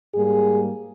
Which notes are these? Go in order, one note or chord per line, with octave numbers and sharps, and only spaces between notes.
G#2 G3 A#3 G#4